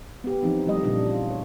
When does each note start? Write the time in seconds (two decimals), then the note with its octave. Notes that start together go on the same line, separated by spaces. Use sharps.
0.24 B3 G4
0.43 E3 F3 C4 D#4
0.66 F3 G3 A3 D#5
0.83 A#2 C#3 G3 D4
1.06 F4
1.30 C#5